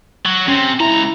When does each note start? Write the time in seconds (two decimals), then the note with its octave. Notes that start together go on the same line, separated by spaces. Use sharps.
0.25 F#3
0.48 C3 C#4
0.80 C#2 E4 A#5